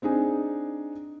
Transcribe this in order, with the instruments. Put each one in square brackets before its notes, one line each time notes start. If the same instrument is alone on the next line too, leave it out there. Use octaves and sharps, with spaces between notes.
[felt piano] C4 D4 D#4 G#4